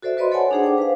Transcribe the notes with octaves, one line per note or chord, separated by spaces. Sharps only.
F#4 A4 C5 D5 E5
F#4 B4 D5 D#5 B5 C6
A4 C#5 D5 F#5 G#5 A5
D4 D#4 G#4 C5 F#5
G5 D6
B4 C5 F5